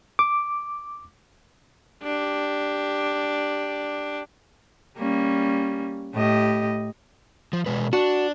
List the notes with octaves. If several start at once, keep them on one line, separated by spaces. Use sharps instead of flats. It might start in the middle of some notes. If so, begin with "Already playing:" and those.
D6
D4 G4
G3 A#3 C#4
A2 G4 D#5
F3
B2 G#3 B4
D4 F#4